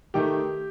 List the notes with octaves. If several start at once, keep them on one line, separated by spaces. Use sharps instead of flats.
D#3 A3 G4